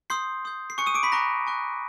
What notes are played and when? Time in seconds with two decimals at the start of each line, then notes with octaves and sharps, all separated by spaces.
0.10 C6 D#6 G6 C7
0.45 C6 D#6 G6
0.70 C7
0.78 G#5 C#6 F#6 C#7
0.86 D#6 D#7
0.94 D6 D7
1.03 B5 B6
1.12 G#5 A#5 C#6 F#6 A#6
1.46 G#5 C#6 F#6